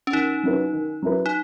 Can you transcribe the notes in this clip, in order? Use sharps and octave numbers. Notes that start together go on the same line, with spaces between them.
C#4
D#3 D#4
F#3 C#4 E4 B4
D#3
F#3 C#4 E4 B4
D#4